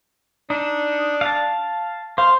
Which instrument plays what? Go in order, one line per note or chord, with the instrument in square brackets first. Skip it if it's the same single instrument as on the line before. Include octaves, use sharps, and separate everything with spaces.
[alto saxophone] D4 [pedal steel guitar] D#4
[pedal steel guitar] F5 A5
[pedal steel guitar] C5 [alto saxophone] F5